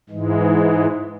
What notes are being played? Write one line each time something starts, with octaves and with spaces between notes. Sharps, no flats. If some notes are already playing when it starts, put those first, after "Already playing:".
G#2 E3 G#3